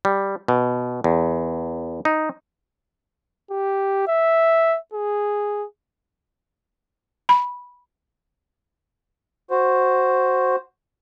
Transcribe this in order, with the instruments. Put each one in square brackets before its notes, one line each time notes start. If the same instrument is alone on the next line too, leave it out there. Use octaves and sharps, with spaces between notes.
[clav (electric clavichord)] G3
B2
E2
D#4
[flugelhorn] G4
E5
G#4
[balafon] B5
[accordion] F#4 C5